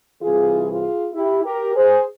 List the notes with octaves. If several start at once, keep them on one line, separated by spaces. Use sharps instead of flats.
C2 C3 E3 F4 G#4
F4 G#4
E4 G4
G4 A#4
G#4 C5